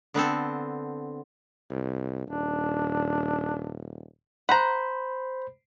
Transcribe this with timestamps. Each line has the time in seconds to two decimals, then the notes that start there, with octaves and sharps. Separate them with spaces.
0.14 D3 B3 C4 A4
1.70 C2
2.27 D#1 D4
4.49 C5 F#5 A#5 B5